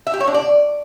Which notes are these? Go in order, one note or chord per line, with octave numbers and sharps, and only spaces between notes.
E5
G4
C#5
D4
D5